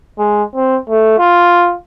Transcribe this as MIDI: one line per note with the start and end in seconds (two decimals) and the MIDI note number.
0.19 0.43 56
0.55 0.78 60
0.89 1.17 57
1.19 1.74 65